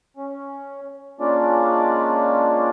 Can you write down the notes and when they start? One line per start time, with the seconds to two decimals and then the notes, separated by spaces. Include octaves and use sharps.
0.17 C#4
1.20 G#3 A#3 C#4 D4 F4 D5